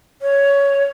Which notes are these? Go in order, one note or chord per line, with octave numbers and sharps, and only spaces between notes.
C#5